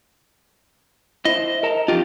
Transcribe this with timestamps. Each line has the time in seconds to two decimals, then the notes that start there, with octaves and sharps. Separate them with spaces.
1.25 E4 C5 D#5 E5
1.63 A#4 A5 A#5
1.88 F2 D#4 F4 G4